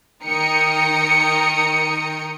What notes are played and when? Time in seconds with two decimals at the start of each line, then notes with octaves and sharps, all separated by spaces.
0.24 D#3 A#4 G5 D#6 C#7